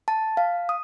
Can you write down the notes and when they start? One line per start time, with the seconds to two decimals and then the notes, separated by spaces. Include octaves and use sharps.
0.08 A5
0.37 F5
0.69 D#6